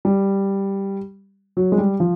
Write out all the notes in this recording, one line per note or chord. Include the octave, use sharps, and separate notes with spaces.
G3
F#3
G#3
G3
F3